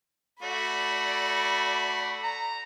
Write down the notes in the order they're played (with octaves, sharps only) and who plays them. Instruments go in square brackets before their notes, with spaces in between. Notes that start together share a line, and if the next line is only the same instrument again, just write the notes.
[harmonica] A3 F#4 [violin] D5 B5
[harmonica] A#5